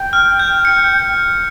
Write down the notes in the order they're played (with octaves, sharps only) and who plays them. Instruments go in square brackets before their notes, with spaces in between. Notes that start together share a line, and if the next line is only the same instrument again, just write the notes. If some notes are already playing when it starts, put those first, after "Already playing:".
Already playing: [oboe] G5
[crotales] F6
G6
C#7